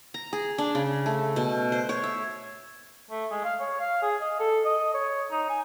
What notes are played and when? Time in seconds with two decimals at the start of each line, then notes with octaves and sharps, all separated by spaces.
0.14 A#5
0.33 G#4
0.58 D4
0.75 C#3
1.06 A3
1.36 B2
1.72 C5
1.89 C#5
2.04 E5
3.11 A3
3.31 G#3
3.44 F5
3.60 C#5
3.80 F5
4.02 G#4
4.21 D#5
4.40 A4
4.66 D#5
4.94 C#5
5.31 D#4
5.49 G#5